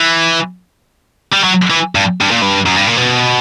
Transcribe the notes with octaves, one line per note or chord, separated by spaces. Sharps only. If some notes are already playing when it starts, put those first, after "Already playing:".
Already playing: E3
G3
F#3
E3
G2
G2
A#2
G2
F#2
G2
A#2
B2